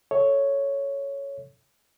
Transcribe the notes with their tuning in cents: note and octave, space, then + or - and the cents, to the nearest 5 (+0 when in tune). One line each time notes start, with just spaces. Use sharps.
A4 +5 C#5 +0 E5 -40